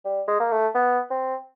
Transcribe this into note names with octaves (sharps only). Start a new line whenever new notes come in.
G3
G#3
A#3
A3
B3
C4